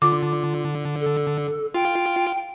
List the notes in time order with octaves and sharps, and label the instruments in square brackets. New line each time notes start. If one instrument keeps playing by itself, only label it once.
[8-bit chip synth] D3 [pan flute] F4 [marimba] D6
[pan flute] A4
[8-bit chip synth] F4 [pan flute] G5